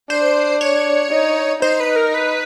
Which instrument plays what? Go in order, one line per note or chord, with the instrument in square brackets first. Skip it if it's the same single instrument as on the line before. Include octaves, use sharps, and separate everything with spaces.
[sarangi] D4 [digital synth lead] C5
[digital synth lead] C#5
[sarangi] D#4
[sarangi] D#4 [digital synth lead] C5
[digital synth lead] B4
A#4
B4